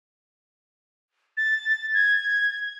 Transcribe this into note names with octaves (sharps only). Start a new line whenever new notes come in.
A6
G#6